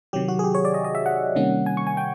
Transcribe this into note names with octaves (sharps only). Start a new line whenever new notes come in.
C3 D#3 F#3 G4
F#4
G#4
G4
C#5
D5
D#5
D#5
E5
F#5
C3 D#3 G3 A#3 C#4
G#5
C#6
G#5
G5